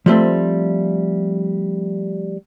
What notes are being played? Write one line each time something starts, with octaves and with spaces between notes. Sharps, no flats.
F3 G3 A3 C4